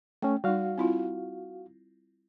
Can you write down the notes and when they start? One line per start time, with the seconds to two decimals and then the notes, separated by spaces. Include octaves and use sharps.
0.22 A3 C#4 G5
0.44 G3 D#4 F#4 F5
0.78 C4 E4 F4